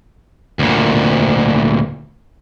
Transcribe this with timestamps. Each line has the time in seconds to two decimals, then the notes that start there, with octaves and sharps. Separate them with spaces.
0.59 D2 A#2